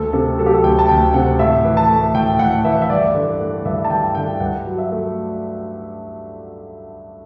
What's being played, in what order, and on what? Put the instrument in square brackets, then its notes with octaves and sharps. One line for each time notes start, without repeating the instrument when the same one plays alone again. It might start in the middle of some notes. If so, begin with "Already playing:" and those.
Already playing: [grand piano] D2 A4
C3 A4
F#3 A4
G4
A4
D2 G5
A5
D2 G5
C3 F#5
A2 E5
E3
A5
A3
A2 G5
A2 F#5
E3 E5
E5
G2 D5
D3
A3
G2 E5
A5
G2 G5
D3 G5
G2 F#5
F#3
E5
A3